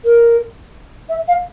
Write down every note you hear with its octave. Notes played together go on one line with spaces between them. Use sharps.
A#4
E5
F5